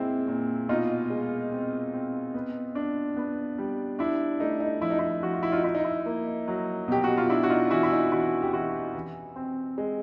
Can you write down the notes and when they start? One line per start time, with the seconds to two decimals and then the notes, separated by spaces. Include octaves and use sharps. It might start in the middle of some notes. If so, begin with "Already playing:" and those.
Already playing: A#2 G#3 C4 E4
0.28 A#2
0.69 B2 D#4 F4
1.10 G#3
1.52 C4
1.94 C4
2.34 B3
2.75 D4
3.17 B3
3.58 G3
3.99 D4 E4
4.40 A3 D#4
4.60 D#4
4.81 F3 E4
4.90 D#4
4.99 E4
5.23 F3 F#4
5.34 F4
5.43 E4
5.52 D#4 F4
5.64 D#4 E4
5.75 D#4
5.85 E4
6.06 A#3
6.48 F#3
6.88 B2 G4
7.04 F#4
7.17 F4
7.29 D4 E4
7.43 F#4
7.50 D#4 F4
7.70 E3 E4 F#4
7.83 E4
7.92 D#4 F4
8.12 E3 E4 F#4
8.42 G4
8.53 E3 E4 F#4
8.95 E3
9.36 C4
9.78 G#3